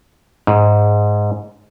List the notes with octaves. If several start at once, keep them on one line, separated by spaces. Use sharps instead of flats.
G#2